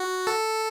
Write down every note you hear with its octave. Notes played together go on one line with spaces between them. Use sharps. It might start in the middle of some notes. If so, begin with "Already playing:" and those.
Already playing: F#4
A4